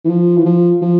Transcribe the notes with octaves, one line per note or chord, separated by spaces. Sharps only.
E3
F3
E3
F3
F3